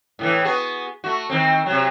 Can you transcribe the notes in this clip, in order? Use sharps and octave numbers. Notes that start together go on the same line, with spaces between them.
A2 D#3 E3
B3 F#4 G#4
A3 F#4
D#3 C4
C3 F#3